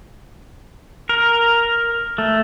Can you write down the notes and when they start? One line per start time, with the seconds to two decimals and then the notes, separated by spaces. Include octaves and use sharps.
1.09 A#4
2.18 A3